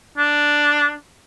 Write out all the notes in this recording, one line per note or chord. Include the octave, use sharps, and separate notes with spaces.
D4